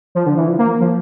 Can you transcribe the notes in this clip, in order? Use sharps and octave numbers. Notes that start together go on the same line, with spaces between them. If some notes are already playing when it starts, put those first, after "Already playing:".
F3
D3
E3
F3
A#3
F3